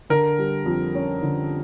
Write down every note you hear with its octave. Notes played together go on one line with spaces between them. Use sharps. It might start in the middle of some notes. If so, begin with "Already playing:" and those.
D3 A#4
G3
F2
C#4
D3